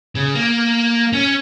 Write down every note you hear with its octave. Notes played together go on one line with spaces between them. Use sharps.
C#3
A#3
C#4